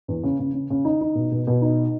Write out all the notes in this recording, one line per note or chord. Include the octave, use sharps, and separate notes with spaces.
E2
C#3
C#3
C#3
C#3
D#4
D#4
B2
B2
B2
D#4